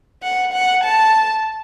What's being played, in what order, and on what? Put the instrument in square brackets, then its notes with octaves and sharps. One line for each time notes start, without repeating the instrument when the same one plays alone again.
[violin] F#5
F#5
A5